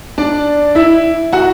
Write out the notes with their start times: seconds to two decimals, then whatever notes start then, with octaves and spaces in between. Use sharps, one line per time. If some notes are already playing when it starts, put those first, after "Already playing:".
0.18 D4 D5
0.75 E4 E5
1.33 F#4 F#5